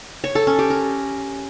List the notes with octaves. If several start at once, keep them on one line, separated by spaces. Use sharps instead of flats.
C#5
A4
C#4
G4
A#4